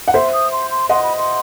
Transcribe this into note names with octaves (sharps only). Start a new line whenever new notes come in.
F#5
C5 E5 C6
D#6
C6
C6
D#5 F#5 C6
B5
C6